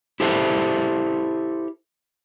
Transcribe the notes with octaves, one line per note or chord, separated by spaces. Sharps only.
E4 G4 A4 C5 E5